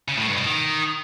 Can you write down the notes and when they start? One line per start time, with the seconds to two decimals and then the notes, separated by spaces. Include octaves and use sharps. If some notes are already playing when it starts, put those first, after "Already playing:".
0.08 C#3
0.18 A2
0.27 G2
0.37 B2
0.46 D#3